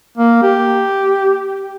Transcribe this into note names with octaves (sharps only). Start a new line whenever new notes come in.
A#3
G4